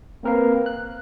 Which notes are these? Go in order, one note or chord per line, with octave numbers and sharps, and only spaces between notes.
A#3 C4 A#4 B4 F5
F#6